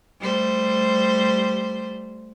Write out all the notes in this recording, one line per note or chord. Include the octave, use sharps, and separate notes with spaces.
G3 A3 C5